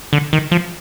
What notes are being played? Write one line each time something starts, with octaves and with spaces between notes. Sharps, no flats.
D3
D#3
F3